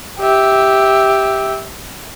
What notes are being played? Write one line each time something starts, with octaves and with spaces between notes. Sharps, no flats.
G4 E5